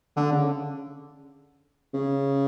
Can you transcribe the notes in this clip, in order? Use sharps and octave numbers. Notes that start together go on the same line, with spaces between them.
D3
C#3
C#3